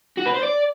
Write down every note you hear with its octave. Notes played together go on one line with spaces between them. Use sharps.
F#4
B4
C5
D5